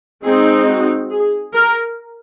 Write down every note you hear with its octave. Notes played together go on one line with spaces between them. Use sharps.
G#3 C4 D#4 G#4
F#4
G#4
A#4